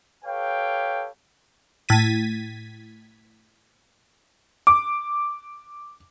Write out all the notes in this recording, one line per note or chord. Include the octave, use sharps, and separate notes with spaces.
G4 A4 B4 C#5 F5 G5
A2 G#6 A6 B6 D#7
D6